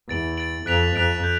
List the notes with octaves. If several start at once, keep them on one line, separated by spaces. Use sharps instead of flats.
E2 A6 D7 F#7
A6 D7 F#7
F2 F#6 B6 D7 F7
F2 F#6 B6 D7 F7
G6